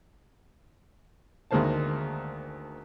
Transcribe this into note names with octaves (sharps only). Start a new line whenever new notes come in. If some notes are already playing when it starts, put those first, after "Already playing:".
D2 D#3 G#3 A#3 C5 A5